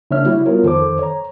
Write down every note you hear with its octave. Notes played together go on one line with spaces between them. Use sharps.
C#3 A#3 D4 C#5 E5 F6
G3 E4 F#4
B3 F4 A#4 C#5
F2 D#3 A4 C5 D6
C#5 A#5